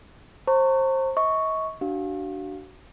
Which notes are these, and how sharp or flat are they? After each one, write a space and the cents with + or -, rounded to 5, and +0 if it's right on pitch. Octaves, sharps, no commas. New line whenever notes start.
C5 +25 A#5 -40 C#6 +0
D#5 +40 C#6 +0
D4 +0 F#4 +30 F5 +5